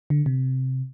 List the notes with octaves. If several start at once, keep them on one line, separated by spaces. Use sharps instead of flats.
D3
C3